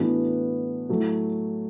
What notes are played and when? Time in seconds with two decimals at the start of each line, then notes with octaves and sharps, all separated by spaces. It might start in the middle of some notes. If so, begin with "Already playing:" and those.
Already playing: A2 E3 B3 D4 F#4
0.89 A2 F#3 A3